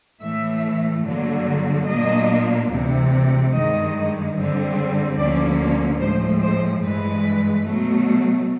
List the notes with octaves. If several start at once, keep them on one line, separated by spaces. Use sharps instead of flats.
A2 E3 A3 E5
G2 D3 F#3 A#3
A#2 F#3 A#3 D4 D#5
D2 C3 E3
G2 D#3 G#3 D#5
G2 D3 G3 C4
D2 D3 F3 A#3 C#4 D5
A2 F3 G#3 C5
C5
G2 E3 G#3 B4
B2 F#3 A3